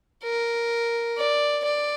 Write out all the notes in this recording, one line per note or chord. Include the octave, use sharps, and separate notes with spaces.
A#4
D5
D5